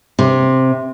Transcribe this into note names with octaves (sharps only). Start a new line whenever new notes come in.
C3